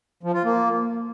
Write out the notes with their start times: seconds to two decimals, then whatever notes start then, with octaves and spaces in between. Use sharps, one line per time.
0.23 F3
0.33 F4
0.44 A#3